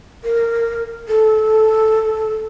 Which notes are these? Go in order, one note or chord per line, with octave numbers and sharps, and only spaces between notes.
A#4
A4